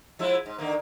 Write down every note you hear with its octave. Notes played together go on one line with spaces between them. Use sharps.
F3 G#3 E4
G#2
D3 D#3 A#3